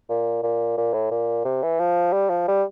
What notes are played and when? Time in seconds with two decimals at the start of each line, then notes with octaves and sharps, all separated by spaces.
0.09 A#2
0.43 A#2
0.77 A#2
0.94 A2
1.11 A#2
1.45 C3
1.63 E3
1.79 F3
2.13 G3
2.30 F3
2.48 G3